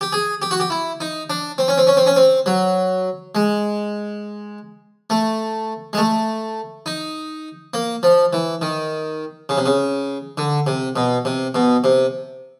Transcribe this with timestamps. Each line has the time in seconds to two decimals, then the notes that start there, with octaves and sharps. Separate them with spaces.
0.01 G4
0.12 G#4
0.42 G4
0.51 F#4
0.60 G4
0.70 E4
1.01 D#4
1.30 D4
1.58 C4
1.68 C#4
1.78 C4
1.87 C#4
1.97 C4
2.06 C#4
2.16 C4
2.46 F#3
3.35 G#3
5.10 A3
5.93 G#3
5.98 A3
6.86 D#4
7.74 A#3
8.03 F3
8.33 E3
8.62 D#3
9.49 C#3
9.57 C3
9.66 C#3
10.38 D3
10.67 C3
10.96 B2
11.25 C3
11.55 B2
11.84 C3